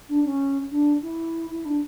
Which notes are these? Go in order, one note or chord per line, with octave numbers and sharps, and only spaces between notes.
D4
C#4
D4
E4
E4
D4